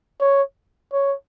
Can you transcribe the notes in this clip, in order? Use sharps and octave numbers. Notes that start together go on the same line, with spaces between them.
C#5
C#5